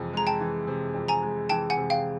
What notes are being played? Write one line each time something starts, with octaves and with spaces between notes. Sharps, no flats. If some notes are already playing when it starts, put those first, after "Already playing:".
Already playing: F2 C3 E3 G#3
G#3 A#5
G5 A5
E3
C3
F2
G#5 A#5
G#3
E3 G5 A5
F#5 G#5
C3
F5 G5